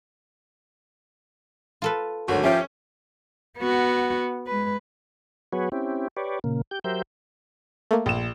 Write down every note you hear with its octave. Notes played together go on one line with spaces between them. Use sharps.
F4 A4 B4
G#1 D2 F#3 F#4
F3 C#4 G4 E5
B3 F#4
G#3 B4
F#3 B3 F#4 G#4 B4 C#5
C4 C#4 E4 G4
G4 B4 C#5 D5
A#2 C#3 A#3
G4 G6
F#3 G4 A#4 C5 E5 G6
A3 A#3
A#1 E7